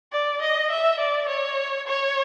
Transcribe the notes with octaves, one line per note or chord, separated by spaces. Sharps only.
D5
D#5
E5
D5
C#5
C#5